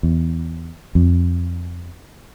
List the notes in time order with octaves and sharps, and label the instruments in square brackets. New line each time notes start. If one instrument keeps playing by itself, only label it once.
[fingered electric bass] E2
F2